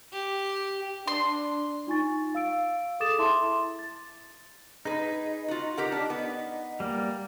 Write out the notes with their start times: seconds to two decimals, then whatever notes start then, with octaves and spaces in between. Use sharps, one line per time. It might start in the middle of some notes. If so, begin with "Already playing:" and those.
0.12 G4
1.07 D4 C6
1.87 D#4 F4 G#5 C#6 A6
2.35 F5 E6 D7
3.00 G#4 A4 D6 D#6 A6 E7
3.18 E4 E5 A5 C6 D6
3.79 A6
4.85 D#4 G#4 B4
5.48 F4 F#4
5.77 G4 A#4 F#5
5.92 D4
6.10 B3
6.80 G3 A#3